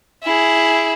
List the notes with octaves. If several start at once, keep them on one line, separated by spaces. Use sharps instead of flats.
E4 G#4